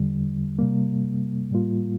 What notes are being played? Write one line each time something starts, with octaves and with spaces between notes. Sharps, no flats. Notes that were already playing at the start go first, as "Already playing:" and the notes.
Already playing: E2 D3 G3
C3 G3 A#3
A2 G3 A#3 F4